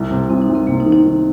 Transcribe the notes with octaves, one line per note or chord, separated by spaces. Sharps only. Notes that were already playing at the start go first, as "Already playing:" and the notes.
Already playing: C2
C3
C2 C4
D#4
C2
C4
C3 A#3
D#4
D#3
D#4
D#3